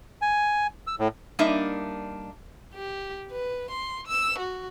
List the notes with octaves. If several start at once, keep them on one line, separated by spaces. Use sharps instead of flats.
G#5
E6
A2
G3 A#3 D4 D#4 E5
G4
B4
C6
E6
F#4